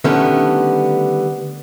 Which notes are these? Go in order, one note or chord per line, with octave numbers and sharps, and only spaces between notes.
D3 D#3 G3 A3 B3 C#4